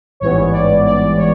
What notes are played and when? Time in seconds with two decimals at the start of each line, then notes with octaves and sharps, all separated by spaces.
0.20 A1 G#2 E3 G3 B3 C#5
0.52 D5
0.85 D5
1.17 C#5